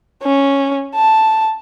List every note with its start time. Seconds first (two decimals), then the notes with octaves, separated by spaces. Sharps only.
0.23 C#4
0.95 A5